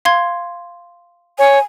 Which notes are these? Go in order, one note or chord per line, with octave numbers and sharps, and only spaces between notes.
F5 C6 G#6
C#5 G#5